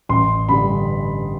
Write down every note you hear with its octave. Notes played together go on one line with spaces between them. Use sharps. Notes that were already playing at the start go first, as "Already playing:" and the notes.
A1 C6
G2 D3 G3 B5